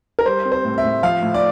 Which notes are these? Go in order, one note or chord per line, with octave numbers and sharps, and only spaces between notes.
A#4
G3 C5
C4
C5
A2
E5
A2
F3 F5
A2
D5